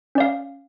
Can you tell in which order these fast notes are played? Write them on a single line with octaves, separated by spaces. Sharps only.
C#4 D5 F5